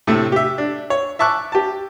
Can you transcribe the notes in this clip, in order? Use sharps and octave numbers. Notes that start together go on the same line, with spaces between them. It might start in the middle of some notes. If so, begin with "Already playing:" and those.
A2 C3 A3
G4 E5
D4
C#5
E5 A5 C#6 D6 F#6
G4 A5